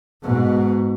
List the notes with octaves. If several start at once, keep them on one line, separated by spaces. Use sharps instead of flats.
G#2 B2